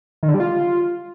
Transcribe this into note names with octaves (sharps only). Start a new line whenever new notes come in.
D#3
D3
G3
F4